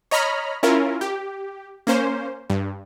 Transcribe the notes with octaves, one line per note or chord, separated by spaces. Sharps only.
C#5 D#5 A#5 B5 F6
C#4 E4 F4 A#4
G4
A#3 C#4 C5
G2